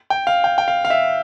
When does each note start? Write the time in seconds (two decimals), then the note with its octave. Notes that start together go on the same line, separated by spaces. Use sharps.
0.10 G5
0.27 F5
0.44 G5
0.58 G5
0.68 F5
0.85 F5
0.90 E5